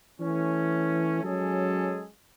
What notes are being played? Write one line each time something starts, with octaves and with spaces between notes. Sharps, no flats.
E3 A3 C#4
F#3 G#3 C#4 G#4 A4